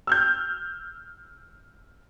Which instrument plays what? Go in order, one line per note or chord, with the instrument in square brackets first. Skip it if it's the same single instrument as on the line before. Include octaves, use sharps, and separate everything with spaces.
[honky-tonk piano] E6 F6 G6